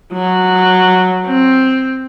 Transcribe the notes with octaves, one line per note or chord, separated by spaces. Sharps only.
F#3
C4